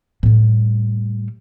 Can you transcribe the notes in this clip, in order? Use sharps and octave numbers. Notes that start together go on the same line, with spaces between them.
A2 G3